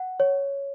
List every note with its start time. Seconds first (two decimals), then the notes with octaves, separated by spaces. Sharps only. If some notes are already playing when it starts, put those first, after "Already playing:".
Already playing: F#5
0.20 C#5